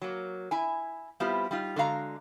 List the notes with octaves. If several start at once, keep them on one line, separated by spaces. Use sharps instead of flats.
F#3 A#3
E4 G#5
G3 B3 C4 E4 F4 G4
G3 D#4 F4
D3 G#3 F#4 F5 A#5